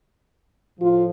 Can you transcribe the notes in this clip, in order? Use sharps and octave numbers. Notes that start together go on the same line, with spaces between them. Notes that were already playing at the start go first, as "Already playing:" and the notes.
A2 F3 F4